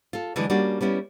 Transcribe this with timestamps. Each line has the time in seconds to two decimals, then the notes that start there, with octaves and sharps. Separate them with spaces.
0.13 F4 A4
0.36 D3 E3 F#3 G#3
0.50 G3 A#3 C#4 D4 F#4
0.81 G3 B3 C#4 E4